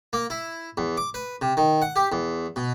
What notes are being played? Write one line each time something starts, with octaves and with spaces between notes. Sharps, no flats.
A#3
E4
E2
D6
B4
C3
D#3
F#5
G4
E2
B2